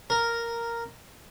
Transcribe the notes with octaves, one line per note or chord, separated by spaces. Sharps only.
A#4